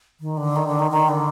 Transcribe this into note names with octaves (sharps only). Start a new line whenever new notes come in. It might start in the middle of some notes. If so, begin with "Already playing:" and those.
D#3
D3
D#3
D3
D#3
D#3
D3